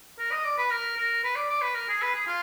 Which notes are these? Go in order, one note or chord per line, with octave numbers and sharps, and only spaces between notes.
A#4
D#5
D5
B4
A#4
A#4
B4
D5
D5
B4
A#4
G#4
B4
G#4
F4